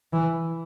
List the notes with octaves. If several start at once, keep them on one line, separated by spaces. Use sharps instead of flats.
E3